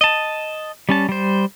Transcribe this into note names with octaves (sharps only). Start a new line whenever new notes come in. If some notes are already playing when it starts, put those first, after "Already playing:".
D#5 A5
G3 C#4 A5
G3 C5